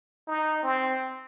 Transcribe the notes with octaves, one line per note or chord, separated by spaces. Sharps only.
D#4
C4